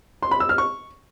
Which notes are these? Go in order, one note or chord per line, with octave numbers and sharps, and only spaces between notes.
C6
B5
E6
F6
C#6